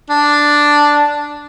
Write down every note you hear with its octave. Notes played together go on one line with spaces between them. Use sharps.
D4